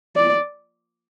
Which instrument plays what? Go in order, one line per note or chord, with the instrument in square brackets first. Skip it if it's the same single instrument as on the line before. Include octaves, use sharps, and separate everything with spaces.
[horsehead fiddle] D5